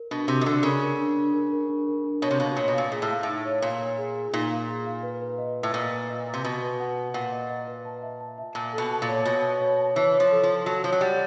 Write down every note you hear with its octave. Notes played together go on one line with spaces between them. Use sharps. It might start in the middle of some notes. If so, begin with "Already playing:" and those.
Already playing: A#4
B2 D4
C3 F#4
D#3
D3 D4
C#3 A#4
A#4
D4
D4
A#4
A#4
D4
A#4
D4
B2 C#5
C3
B2 F5
A#2 C#5
B2
A#2 F5
A#2 G#4
A2
F5
A2 D#4
C#5
A#2 F5
C#5
G#4
G#4
A#2 D#4
F5
G#4
F5
B4
B4
D#5
B4
A2
A#2 D#5
B4
D#5
B4
C3
B2 B4
B4
F#5
B4
A#2 F#5
D#5
D#5
B4
A5
E5
A5
E5
A#2 A5
B2 A4
A5
A#2
C#5
B2 C#5
E5
C#5
A5
E3 C#5
C#5
F3
A4
F3
A5
F#3 A5
F3 C#5
F#3
G3 F#5